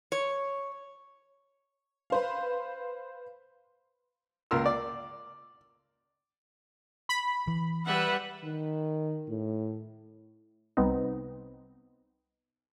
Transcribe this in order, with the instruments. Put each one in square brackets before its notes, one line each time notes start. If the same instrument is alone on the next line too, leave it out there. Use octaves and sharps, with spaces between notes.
[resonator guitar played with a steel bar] C#5
[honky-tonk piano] B4 C5 F5
[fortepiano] C#2 A#3 F4 A#4 C6 E6
D5
[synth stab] B5
[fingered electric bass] E3
[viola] G3 F#5 [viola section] B4 E5
[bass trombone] D#3
A2
[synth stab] C2 B3 C4 D#4